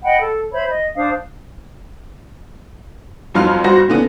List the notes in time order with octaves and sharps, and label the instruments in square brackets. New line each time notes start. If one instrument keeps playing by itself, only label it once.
[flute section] D#5 F#5 G5 B5
A4
C5 C#5 E5 B5
D#5
D4 C5 F5 D#6
[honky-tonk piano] G1 F2 F#3 F5 C6 F6
G1 F#4 C5 A#6
A#2 D3 B3 C#4